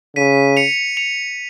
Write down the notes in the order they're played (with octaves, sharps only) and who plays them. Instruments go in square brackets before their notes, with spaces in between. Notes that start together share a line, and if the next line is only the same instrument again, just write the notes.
[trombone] C#3 [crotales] B6 D#7
[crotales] C#7 F7
C#7 F7